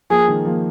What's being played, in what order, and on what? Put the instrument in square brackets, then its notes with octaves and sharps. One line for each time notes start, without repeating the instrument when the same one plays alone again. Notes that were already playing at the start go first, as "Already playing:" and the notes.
[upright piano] F3 A#3 [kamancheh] G#4
[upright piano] D#3 G#3
F3 A#3